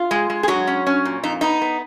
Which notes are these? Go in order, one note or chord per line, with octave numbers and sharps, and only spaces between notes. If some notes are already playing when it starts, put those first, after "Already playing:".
Already playing: F4
G#3
G#3
G#4
F#3 G#3 F#4
C#4
C#4
A#2
F2 D#4
B3 D#4
B3